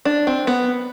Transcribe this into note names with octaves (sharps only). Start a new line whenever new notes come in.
D4
C4
B3